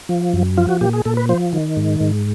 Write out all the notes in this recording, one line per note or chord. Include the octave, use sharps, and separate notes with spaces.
F3
F#2
F3 F4
F#4
A#2 G4
G#4
A#2 A4
B4
F3 C5
D#3
G#2
G#2